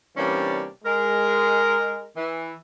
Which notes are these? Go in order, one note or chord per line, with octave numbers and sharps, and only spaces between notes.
C3 E3 G3 A#3 C#4 D4
G#3 A#4
E3